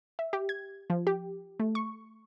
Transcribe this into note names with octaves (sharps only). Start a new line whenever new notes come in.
E5
G4
G#6
F3
G4
A3
C#6